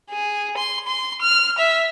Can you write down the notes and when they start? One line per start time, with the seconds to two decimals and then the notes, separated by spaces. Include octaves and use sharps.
0.11 G#4
0.57 C6
0.88 C6
1.22 F6
1.58 E5